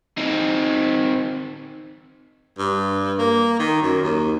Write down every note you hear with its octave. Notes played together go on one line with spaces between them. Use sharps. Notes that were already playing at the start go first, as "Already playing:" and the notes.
C4 D#4
G2
A#3
D#3
F#2
D#2